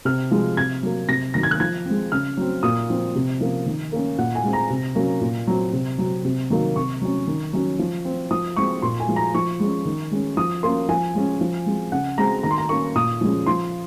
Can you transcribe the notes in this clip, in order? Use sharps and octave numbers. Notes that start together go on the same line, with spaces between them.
C3 F6
F3 G#3
C3 G#6
F#3 A#3
C3 A#6
D#3 F#3 A#6
G#6
F#6
F3 G#6
G#3 C4
C#3 F6
F#3 C4
A#2 D#6
F3 C4
C3
F3 A#3 C#4
D#3
A#3 C#4
A#2 F#5
G#5
G#3 C4
A#5
C3
F#3 A#3 C#4
A#2
F#3 C4
C3
F#3 C4
C3
D#3 F#3 A#3
C3 C#6
F#3 C#4
D#3
F#3 C#4
F3
C4
F3 D#6
G#3 C4 C#6
A#2 C6
G#5
F3 G#3
A#5
F3 C#6
G#3 C#4
D#3
G#3 C#4
F3 D#6
A#3 C#4 C6
F3 G#5
G#3 C#4
F3
G#3 C4
C#3 F#5
G#3 C4 A#5
D#3 A#5
C6
A#5
A#3 C#4 C#6
A#2 D#6
F3 G#3 C#4
F3 C6